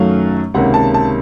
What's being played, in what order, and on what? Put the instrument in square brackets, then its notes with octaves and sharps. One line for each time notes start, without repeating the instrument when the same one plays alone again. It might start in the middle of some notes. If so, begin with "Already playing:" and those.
Already playing: [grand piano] F#2 D#3 F#3 A3 C#4 F5
C#2 C3 D#3 A#3 C#4 F#5
A5
A5